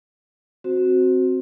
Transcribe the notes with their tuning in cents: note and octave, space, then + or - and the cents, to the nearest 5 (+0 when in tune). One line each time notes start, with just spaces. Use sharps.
C4 +0 F#4 +0 C5 +0